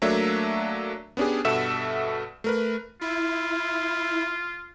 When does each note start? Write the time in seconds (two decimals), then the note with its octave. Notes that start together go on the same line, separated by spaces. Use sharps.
0.02 F#3 A3 A#3 D4 C#5 E5
1.17 B3 C#4 D4 G4 G#4
1.45 G2 B2 A4 E5 F#5 E7
2.44 A3 A#4 B4
3.01 E4 F4